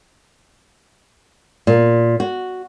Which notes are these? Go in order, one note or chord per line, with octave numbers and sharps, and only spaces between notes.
A#2
F#4